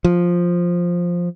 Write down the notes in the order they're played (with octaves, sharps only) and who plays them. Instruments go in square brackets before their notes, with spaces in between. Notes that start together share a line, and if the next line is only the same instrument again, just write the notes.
[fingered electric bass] F3